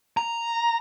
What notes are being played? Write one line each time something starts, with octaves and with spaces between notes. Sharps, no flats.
A#5